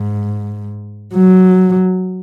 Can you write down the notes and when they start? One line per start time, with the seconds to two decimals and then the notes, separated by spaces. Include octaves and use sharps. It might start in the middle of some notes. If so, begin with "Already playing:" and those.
Already playing: G#2
1.15 F#3